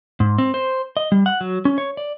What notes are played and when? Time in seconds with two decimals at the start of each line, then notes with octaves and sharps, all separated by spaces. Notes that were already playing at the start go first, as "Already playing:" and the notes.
0.20 G#2
0.38 C4
0.54 C5
0.97 D#5
1.12 G3
1.26 F#5
1.41 F#3
1.65 C#4
1.78 C#5
1.97 D5